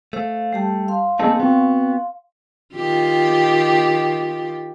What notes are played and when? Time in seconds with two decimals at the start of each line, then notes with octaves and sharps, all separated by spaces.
0.13 A3 C5 F5
0.53 G3 G4 A5
0.88 F5 C6
1.19 A3 A#3 C4 D#4 G#4 A5
1.40 B3 C4 F#4
2.75 D#3 F4 G4